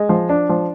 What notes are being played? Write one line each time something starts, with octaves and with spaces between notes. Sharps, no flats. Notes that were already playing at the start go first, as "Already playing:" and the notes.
Already playing: G#3
F3
D4
F3